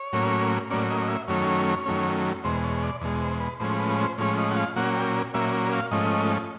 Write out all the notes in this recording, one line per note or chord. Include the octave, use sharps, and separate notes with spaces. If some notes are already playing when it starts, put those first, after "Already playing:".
Already playing: C#5
A2 F#3 A#3 C#4
A2 F#3 A#3 C#4 D5
D#5
D#5
E5
F#2 D#3 F#3 A3 C#4 C#5
F#2 D#3 F#3 A3 C#4
E2 B2 G#3 C5
C#5
C#5
D5
E2 B2 G#3
C5
B4
A2 F3 G#3 C#4 C5
B4
C5
A2 F3 G#3 C#4 C#5
D#5
F#5
F5
A#2 F#3 A#3 C#4 F#5
G5
A#2 F#3 A#3 C#4 E5
F5
G#2 F3 A3 C#4 D#5